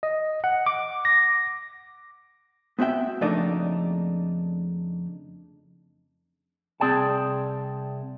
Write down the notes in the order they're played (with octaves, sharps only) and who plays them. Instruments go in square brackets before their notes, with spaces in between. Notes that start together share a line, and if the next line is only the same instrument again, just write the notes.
[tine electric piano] D#5
F#5
D6
A#6
[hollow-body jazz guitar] B3 C4 F#4 E5 G5
F2 C#3 A3 A#3 D4 D#4
[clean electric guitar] C2 C4 G#4 D5 G5 A5